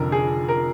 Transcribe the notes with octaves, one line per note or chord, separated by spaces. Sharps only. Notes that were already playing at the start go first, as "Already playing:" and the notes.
Already playing: F1 F2 D3 A#4
G#4
A#4